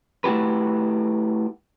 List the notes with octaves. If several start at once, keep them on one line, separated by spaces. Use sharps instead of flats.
A3 E4 F#4 G4 B4